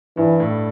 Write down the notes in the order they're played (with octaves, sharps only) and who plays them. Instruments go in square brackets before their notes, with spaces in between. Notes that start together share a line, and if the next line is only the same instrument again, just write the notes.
[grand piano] G2 [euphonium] E3
[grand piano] A2